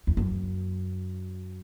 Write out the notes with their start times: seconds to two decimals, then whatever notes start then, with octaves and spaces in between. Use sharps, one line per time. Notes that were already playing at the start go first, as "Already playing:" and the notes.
0.07 E2
0.17 F#2